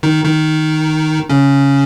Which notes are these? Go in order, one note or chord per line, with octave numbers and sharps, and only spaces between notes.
D#3 D#4
D#3 D#4
C#3 C#4